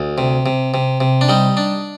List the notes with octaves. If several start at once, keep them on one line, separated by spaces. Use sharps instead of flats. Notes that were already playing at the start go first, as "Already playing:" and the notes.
Already playing: D2
C3
C3
C3
C3
D4
G3 D#4
D4